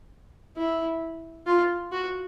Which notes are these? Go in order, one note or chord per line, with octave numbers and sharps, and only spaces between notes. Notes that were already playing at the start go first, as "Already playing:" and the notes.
E4
F4
F#4